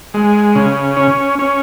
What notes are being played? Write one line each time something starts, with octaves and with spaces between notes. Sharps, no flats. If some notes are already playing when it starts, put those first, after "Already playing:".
G#3
C#3
C#4
C#4